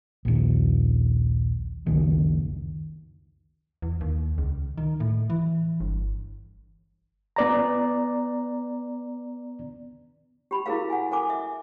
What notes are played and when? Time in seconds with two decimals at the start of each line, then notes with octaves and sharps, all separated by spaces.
0.25 A#1 D#2
1.87 F#1 C#2 D#3
3.82 E2
4.01 D#2
4.38 C#2
4.78 D#3
5.00 A2
5.30 E3
5.80 G1
7.36 B3 D5 A#5
10.51 G4 B5
10.66 E4 F#4 G#4 A#4 F5
10.90 F#5 G#5
11.11 A4 A#4 G#5 D6
11.30 E5